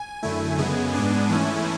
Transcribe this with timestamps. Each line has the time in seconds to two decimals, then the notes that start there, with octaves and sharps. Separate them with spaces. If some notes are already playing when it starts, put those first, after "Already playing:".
Already playing: G#5
0.23 F#2 D3 A3 E4
0.58 F#2 C#3 G#3 B3
0.94 G#2 G#3 B3 D4
1.29 G#2 E3 A3 C#4 E4 G#5